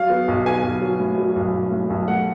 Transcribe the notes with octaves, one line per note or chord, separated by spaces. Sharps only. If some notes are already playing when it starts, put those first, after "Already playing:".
Already playing: F#3 F5
B3
B1
B3 G#5
B1
F#3
A2
F#3
B1
B1
A2
B1
A3 F#5